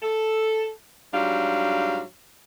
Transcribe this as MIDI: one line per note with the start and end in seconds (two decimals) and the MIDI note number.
0.02 0.70 69
1.13 2.02 44
1.13 2.02 54
1.13 2.02 55
1.13 2.02 62
1.13 2.02 77